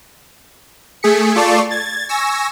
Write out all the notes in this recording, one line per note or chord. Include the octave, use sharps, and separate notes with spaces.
A3 G#4 B6 C#7
A3 F4 D5 A5 C#6 C7
G#6 A6
G#5 C#6 E6 A#6